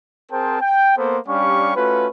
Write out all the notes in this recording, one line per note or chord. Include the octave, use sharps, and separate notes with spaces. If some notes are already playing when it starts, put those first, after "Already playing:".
C4 G#4 A#4 C5 G5 A5
G5
A#3 B3 A4 C5
G3 C#4 D4 G4 F5 C#6
A3 C#4 F4 F#4 B4